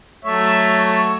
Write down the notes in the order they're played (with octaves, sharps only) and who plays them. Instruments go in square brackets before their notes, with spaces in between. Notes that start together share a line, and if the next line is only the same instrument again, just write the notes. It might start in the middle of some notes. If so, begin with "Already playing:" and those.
[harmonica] F#3 A3 C#5 [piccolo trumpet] E5